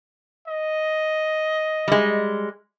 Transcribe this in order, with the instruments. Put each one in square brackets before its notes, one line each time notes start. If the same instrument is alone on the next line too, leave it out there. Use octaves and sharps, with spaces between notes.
[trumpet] D#5
[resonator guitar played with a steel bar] G3 G#3